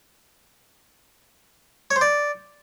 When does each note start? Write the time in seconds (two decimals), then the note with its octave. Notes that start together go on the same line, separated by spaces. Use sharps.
1.91 C#5
1.96 C5
2.01 D5